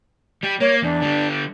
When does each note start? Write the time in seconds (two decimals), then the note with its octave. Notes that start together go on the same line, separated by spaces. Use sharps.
0.43 G3 G4
0.60 A#3 C#5
0.82 E2 D4
1.02 D3 G3